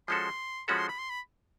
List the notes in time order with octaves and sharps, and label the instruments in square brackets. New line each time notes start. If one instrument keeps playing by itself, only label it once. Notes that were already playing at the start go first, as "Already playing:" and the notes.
[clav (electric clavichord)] F3 G#3 C#4 F#4 A4 [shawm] C6
[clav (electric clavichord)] F3 G#3 C#4 F#4 A4 [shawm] B5
[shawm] C6
B5
C6
B5